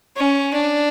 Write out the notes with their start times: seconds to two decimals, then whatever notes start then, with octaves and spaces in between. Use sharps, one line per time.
0.17 C#4
0.54 D4